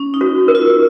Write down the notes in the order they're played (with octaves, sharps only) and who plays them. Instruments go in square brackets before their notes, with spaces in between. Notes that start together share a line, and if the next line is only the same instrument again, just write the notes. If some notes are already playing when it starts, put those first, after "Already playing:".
Already playing: [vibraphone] C#4
D#4
[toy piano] F#4
A#4
[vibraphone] F4